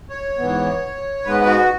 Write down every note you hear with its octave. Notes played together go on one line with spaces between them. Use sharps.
C#5
G#2 E3 B3
G#2 G#3 B3 B4
F#4